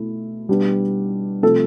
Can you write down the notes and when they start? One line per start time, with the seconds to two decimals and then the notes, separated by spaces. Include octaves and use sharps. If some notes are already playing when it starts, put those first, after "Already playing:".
Already playing: B2 A3 E4
0.49 B2 G3 B3 D4
1.43 C3 F3 A3 A4